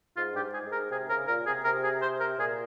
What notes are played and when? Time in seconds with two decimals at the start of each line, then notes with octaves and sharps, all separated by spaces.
0.17 G#2 F4
0.31 G2 G4
0.41 G#2
0.53 G#4
0.66 G#2
0.72 A#4
0.91 C3 G#4
1.10 C#3 A#4
1.24 G#2
1.27 A#2 A#4
1.46 C3 G#4
1.64 C3 A#4
1.84 G#4
2.02 C5
2.20 A#4
2.39 A#2 G#4